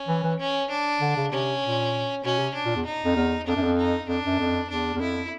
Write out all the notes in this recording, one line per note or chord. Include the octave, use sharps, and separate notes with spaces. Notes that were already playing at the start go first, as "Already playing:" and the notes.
Already playing: C#4
E3
E3
C#4
D4
D3
C#3
C3 C#4
A#2
B2 C#4
C3
D4
A#2
E2
D#4
F2
E2
F2 D4
F#2
F2
D#4
F2 D4
F#2
F2
E2 D4
E2
F2 E4